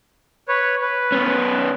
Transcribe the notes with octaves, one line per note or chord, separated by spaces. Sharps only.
B4 C#5
B4
B3 C#4